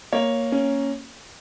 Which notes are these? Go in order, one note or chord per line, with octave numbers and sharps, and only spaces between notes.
A#3 C#5
C#4